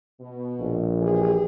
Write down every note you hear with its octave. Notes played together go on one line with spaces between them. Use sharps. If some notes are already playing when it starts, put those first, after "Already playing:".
B2
A#1
E3 G4 G#4